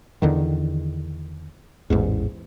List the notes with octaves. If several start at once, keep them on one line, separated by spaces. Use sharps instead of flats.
E2 D3 D#3
A1 E2 G#2